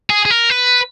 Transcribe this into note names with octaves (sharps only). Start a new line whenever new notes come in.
G#4
G#4
A#4
B4